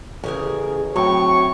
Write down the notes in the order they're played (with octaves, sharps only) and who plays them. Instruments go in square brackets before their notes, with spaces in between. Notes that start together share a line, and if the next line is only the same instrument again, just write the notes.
[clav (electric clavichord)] A1 [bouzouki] C#3 G#4 A#4
[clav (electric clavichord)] A2 [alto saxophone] F#3 [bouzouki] C4 [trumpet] C#6